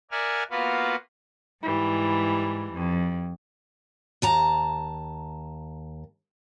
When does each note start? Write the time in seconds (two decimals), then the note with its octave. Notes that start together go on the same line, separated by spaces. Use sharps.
0.11 A#4 D5 E5 F#5 G#5 F6
0.51 A#3 B3 F4 F#4 B4 F5
1.63 G#2 E3 G3
2.73 F2
4.22 D#2 A5 A#5